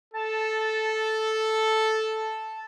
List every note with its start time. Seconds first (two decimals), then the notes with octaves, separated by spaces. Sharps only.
0.14 A4 A5